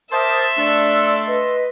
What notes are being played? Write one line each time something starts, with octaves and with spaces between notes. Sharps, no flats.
A#4 C5 E5 A5 C6 D6 D#6
A3 D4 A4 D5 E6
B4 D#5